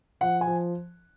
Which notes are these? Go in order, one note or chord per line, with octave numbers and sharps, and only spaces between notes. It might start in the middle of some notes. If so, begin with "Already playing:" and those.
F3 F#5
G#5
F3